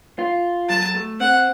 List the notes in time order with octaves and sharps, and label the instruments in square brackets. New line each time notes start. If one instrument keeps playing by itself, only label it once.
[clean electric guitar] F4
[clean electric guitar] F#3 [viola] A5
[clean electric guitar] A3
[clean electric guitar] C4 [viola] F#5